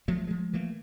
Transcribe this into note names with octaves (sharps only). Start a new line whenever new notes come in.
F3 F#3 A3
F3 G#3
E3 F3 A3 A#3